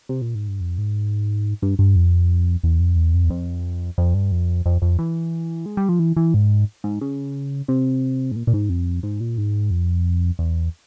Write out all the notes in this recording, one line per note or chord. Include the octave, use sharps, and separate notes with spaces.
C3
A#2
G#2
G2
F2
G#2
G2
G2
F2
E2
F2
E2
F2
E2
F2
F2
G2
F2
F2
F2
E3
G#3
G3
F3
E3
E3
G#2
G#2
C#3
C3
G#2
A#2
A#2
G#2
F2
G#2
A#2
G#2
F2
E2